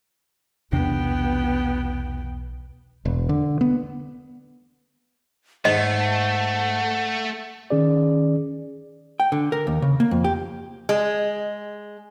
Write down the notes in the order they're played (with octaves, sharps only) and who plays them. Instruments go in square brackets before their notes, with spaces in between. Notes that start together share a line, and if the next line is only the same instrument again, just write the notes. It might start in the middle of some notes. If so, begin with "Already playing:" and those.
[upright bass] B1 [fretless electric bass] E2 C3 D4 [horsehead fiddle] B3 G5
[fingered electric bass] E1
D3
B3
[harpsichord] G#2 [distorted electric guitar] A3 [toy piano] D#5 [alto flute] F#5
[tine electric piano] D#3 C#4 G#4 D5
[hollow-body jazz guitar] G5
D3
A#4
D#2
C#3
A#3
F2
G4
[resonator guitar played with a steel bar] G#3